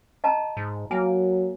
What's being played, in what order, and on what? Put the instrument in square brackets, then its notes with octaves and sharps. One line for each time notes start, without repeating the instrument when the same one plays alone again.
[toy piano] D#5 A5 A#5
[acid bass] G#2
[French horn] F#3 [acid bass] A#3 [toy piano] G#5